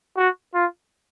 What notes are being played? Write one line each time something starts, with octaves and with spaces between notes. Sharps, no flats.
F#4
F4